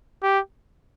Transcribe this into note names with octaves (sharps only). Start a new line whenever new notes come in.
G4